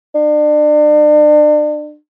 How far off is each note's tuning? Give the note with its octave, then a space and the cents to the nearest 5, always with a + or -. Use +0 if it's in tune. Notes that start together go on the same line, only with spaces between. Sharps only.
D4 +35